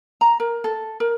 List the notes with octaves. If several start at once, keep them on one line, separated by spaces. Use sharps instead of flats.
A#5
A#4
A4
A#4